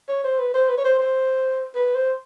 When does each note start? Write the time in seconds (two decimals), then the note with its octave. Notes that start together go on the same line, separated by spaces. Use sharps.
0.09 C#5
0.24 C5
0.39 B4
0.54 C5
0.69 B4
0.77 C#5
0.84 C5
0.99 C5
1.75 B4
1.95 C5